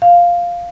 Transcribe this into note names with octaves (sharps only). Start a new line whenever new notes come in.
F5